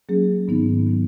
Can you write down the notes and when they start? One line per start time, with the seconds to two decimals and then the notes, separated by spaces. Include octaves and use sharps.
0.09 F#3 A#3 C#4 G#4
0.48 G#2 D#3 F#3 B3 D#4
0.87 D#3 F#3 B3 D#4